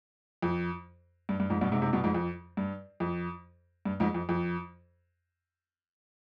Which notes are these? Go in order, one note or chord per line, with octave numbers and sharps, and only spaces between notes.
F2
G2
G2
F2 G#2
G2 B2
G#2 C3
G#2 C3
G2 B2
F2 G#2
F2
G2
F2
G2
F2 G#2
F2
F2